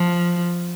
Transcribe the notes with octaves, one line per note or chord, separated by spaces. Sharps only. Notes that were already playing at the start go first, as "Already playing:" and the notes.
Already playing: F3